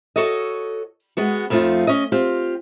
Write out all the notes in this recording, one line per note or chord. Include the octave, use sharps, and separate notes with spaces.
F#4 A4 C#5 D#5
G#3 B3 F#4
F2 F3 A3 D#4 F4
C#4 D#5
C4 F4 G4